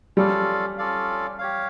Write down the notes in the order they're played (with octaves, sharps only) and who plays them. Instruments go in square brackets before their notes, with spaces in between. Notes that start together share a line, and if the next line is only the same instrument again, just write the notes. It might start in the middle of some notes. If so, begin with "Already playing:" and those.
[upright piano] G3 [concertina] C#4 F4 A4 D5 F5
[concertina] C#4 F4 A4 D5 F5
G4 C#5 F5